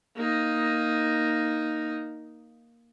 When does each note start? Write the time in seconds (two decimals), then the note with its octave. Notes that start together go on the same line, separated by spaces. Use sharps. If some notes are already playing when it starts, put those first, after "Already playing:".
0.16 A#3 D#4